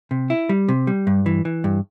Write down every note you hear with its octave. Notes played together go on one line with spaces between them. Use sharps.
C3
E4
G3
C3
G3
G2
E3
E3
G2